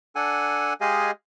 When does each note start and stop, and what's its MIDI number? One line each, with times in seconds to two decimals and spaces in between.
0.16 0.73 62
0.16 0.73 69
0.16 0.73 78
0.16 0.73 80
0.81 1.11 56
0.81 1.11 67
0.81 1.11 68
0.81 1.11 75
0.81 1.11 77
0.81 1.11 80